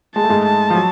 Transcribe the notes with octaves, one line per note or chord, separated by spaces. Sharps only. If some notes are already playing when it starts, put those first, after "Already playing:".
G#3 A5
A3
G#2 G#3
A5
F3
F#3